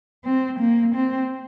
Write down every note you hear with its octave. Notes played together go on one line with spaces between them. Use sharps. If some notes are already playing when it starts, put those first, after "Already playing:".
C4
A#3
C4